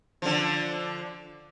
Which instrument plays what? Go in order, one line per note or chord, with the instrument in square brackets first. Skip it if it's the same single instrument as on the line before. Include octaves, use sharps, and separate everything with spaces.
[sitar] D3 F3